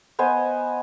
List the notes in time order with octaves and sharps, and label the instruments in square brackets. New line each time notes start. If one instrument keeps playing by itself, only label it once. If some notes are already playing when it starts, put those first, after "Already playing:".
[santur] B3 C5 D#5 G#5